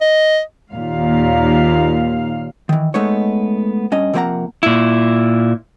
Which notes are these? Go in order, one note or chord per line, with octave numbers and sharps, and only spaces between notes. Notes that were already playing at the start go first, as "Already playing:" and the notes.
D#5
D#2 A#2 F5
D#3 E3
G#3 A3 B3 D#4 C#5
G2 C#4 D#5
C3 F3 A#3 C5 F#5 A#5
A#2 E4